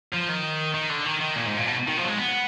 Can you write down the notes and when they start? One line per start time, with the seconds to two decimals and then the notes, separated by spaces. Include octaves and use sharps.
0.13 F3
0.28 D#3
0.74 D#3
0.89 D3
1.05 D#3
1.21 D#3
1.35 A#2
1.46 G#2
1.57 A#2
1.66 B2
1.88 D#3
1.97 F3
2.03 F#3
2.08 G#3
2.18 B3